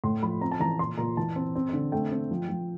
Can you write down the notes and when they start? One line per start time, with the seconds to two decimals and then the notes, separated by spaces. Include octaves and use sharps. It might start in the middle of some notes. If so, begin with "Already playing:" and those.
0.04 A2 C6
0.23 F3 B5
0.41 C4 A#5
0.52 A5
0.60 E3 A#5
0.79 A#2 C6
0.98 A#2 A#5
1.17 E3 A5
1.36 C4
1.55 C4
1.73 D3
1.92 A3 G5
2.12 C4
2.31 F3
2.49 F3